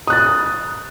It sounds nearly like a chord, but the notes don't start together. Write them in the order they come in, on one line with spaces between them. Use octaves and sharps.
D#6 F#6 A6